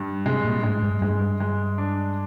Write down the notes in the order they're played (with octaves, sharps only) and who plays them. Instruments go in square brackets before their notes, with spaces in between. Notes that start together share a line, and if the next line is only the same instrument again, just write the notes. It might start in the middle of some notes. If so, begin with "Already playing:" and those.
Already playing: [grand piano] G2
[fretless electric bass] C3 [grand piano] G#3
[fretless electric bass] A#2
[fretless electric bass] G#2 [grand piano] G#3
[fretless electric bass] G2
[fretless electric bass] G2 [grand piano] G#3
[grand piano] G#3
D4